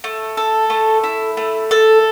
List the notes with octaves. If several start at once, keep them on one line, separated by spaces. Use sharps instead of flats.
A3
A4
A3
E4
A3
A4